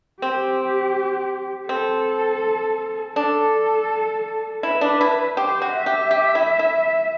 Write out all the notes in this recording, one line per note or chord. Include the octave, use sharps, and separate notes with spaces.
C4 G4
C4 A4
D4 A4
E4 B4
D4
E4
G4 C5
F#4
E5
G4
G4
E4
E4